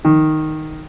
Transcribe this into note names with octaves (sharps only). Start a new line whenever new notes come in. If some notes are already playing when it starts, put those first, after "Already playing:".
D#3